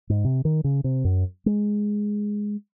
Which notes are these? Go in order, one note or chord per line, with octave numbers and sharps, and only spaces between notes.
G#2
C3
D#3
C#3
C3
F#2
G#3